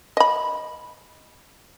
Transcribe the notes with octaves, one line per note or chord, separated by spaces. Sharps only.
D#5 B5